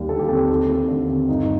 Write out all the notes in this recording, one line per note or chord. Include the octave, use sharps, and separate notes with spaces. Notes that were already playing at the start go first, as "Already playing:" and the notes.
Already playing: D#2 G3 A#3
D3 A4
G4
C4 A4
D#2
A3
D3
C4
G1 D#4